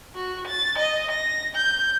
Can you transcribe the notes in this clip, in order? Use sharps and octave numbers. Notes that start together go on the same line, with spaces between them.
F#4
A6
D#5
A#6
G6